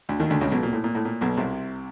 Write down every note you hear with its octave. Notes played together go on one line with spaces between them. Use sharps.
D2 D3
D#2 D#3
D2 D3
C#2 C#3
B1 B2
A#2
A2
A#2
A2
A#2
B1 B2
C2 C3